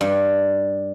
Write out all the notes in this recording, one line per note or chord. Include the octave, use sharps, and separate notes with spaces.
G2